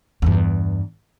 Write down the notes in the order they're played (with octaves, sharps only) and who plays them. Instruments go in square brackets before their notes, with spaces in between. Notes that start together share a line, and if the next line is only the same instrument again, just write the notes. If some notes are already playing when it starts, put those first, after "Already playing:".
[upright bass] E2 G2